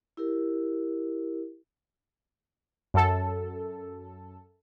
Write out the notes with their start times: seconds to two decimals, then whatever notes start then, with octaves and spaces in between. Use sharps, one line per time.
0.17 E4 G4 A#4
2.94 F#2 A4